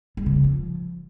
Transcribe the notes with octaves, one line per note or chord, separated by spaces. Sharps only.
G3
C#3
G#3
F3